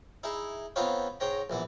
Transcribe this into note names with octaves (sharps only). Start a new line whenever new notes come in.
D#4 E4 G#4
B3 C4 D#4 F4 B4 C#5
G#2 C#5 G5 A#5
A#1 E3 B3